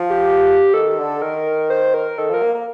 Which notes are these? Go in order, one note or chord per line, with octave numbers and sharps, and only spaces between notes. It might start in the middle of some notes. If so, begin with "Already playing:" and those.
Already playing: F3
G4
D#3 A4
D3
D#3 A#4
C5
A#4
D#3 A4
F3 A#4
A#3
A#3